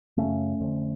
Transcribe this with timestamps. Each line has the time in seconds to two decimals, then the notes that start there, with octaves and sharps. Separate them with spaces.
0.17 F#2 C#3 A3 C#4
0.61 F2 D3